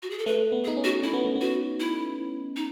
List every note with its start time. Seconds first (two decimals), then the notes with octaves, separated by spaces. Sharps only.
0.03 F#4
0.10 G#4
0.19 A4
0.26 A3 B4
0.52 B3
0.64 G#4
0.68 D#4
0.77 C#4
0.84 F#4
1.03 C#4 E4
1.13 B3
1.25 A3
1.36 B3
1.41 F#4
1.80 E4
2.56 D#4